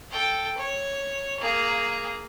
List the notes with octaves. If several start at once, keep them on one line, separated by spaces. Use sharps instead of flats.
A4 G5
C#5
A#3 G#4